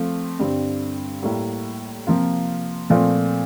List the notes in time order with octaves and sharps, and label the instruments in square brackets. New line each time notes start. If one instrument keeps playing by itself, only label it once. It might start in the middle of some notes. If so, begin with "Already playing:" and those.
Already playing: [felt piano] F3 A3 C4
G2 D3 G3 C4
A2 G3 A#3 E4
C3 F3 A#3 F4
A#2 F3 A3 C4 F4